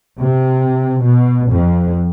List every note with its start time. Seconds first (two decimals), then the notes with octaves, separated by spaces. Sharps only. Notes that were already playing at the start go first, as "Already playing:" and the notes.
0.19 C3
1.02 B2
1.51 F2